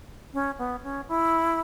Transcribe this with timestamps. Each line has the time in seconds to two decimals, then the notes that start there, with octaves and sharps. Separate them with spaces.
0.34 C#4
0.59 B3
0.83 C#4
1.08 E4